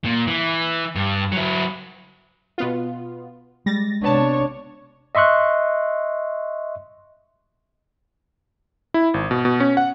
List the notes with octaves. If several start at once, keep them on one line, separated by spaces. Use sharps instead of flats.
A#2
E3
G2
F#3 E4
B2 B3 F4
G3 G#3 A6 A#6
C3 B3 D4 C#5 A5
D#5 E5 C6 C#6 F#6
E4
G#1
B2
B2
C#4
F#5